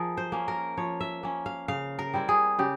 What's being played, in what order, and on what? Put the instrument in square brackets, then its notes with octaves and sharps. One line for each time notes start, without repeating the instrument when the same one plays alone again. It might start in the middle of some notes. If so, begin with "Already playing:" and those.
Already playing: [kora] F3 G#4 A#4
C5
A#3 C#4
A#4
F3 C#5
E5
A#3 C#4
F5
C#3 F5
A#4
G3 C4 E4
G#4
C#3 G4